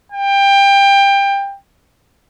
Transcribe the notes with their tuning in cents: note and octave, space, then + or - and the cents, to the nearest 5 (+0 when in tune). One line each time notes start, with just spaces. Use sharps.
G5 +20